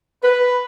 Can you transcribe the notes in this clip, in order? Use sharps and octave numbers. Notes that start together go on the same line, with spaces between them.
B4